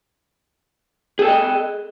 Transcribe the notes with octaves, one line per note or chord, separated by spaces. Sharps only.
G#4 A4 D#5 G5